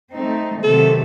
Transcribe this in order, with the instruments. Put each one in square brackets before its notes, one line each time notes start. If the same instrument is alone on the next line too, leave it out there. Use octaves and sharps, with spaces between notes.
[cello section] A3 C4 D#4
[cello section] C3 D#3 F#3 A3 [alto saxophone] A4